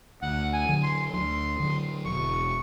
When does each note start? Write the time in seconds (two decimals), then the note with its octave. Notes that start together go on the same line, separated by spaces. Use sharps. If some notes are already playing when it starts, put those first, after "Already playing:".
0.22 D2 F#5
0.53 G#5
0.68 D3 F#3
0.83 C6
1.13 D2 C6
1.60 D3 F#3
2.05 E1 C#6